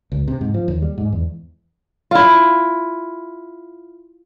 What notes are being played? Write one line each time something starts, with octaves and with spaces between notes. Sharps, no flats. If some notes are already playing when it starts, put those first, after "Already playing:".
C#2
C3
G#2
F3
D#2
G3
G#2
E2
E4 F4